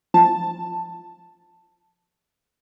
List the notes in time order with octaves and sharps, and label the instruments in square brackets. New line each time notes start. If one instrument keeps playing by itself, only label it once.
[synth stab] F3 A5